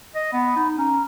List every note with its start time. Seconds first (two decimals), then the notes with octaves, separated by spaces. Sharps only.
0.15 D#5
0.33 B3 B5
0.56 D#4
0.78 C#4 A#5